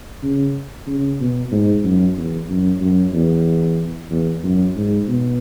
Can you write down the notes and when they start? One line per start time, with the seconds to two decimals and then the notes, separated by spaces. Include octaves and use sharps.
0.23 C#3
0.87 C#3
1.20 B2
1.52 G#2
1.84 F#2
2.17 E2
2.49 F#2
2.81 F#2
3.13 E2
4.10 E2
4.43 F#2
4.76 G#2
5.08 B2